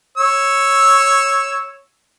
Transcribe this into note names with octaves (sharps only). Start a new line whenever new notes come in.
C#5 E6